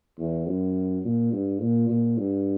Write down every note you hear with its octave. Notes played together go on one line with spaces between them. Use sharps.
E2
F#2
A#2
G2
A#2
A#2
G2